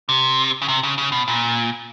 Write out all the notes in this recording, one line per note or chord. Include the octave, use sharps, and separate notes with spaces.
C3
C#3
C3
C#3
C#3
B2
A#2